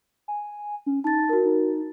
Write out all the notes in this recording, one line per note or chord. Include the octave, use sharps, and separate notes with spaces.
G#5
C#4
D#4 A5 A6
F#4 A#4
D#4